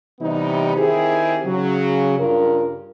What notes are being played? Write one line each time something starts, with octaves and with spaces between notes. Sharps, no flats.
C3 E3 G3 B3 D#4
D#3 C4 E4 G4 G#4
C#3 F#3
G2 C#3 F4 A#4